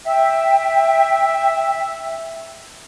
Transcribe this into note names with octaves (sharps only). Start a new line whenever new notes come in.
E5 G5